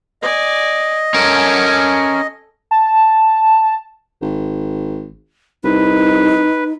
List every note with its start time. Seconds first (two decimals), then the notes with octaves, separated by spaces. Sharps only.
0.22 D5 D#5 G#5
1.14 C#4 A4 A#4 G#5
2.71 A5
4.21 G#1
5.64 C2 D#4 B4